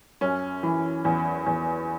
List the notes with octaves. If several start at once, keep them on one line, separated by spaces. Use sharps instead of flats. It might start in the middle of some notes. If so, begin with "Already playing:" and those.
F#2 C#4
E3
E2
E2